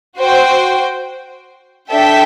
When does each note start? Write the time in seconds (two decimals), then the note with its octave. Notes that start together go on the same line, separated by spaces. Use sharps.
0.18 F#4 C5 G5
1.90 D4 A4 E5 G5